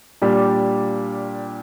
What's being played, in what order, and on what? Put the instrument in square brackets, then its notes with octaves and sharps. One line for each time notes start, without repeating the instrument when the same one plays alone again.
[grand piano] A#2 G3 D4 G4